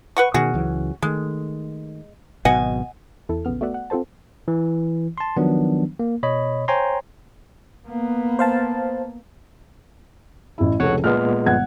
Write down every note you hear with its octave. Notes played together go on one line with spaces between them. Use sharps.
B4 F#5 C#6
B2 D#3 C#4 F#4 G#4
C#2 E3 F#3
D#3 G#3 A3
G#1 B2 F#3 D#5 F#5 G#5
E2 E4 A4
A#1 C#3 B3 F6
A3 B3 F#4 D5 E5 F#5
F#5
C4 F4 A4 C5 A5
E3
A5 C6
D#3 F3 F#3 B3 D4
A#3
B2 C#5 D#5 B5
C5 C#5 G5 G#5 A#5 C6
A#3 B3
C5 F5 A5
A1 E4
F1 C#2 A4 C#5 F#5
A#2 G#3 B3 F6
G1 F#5 G#6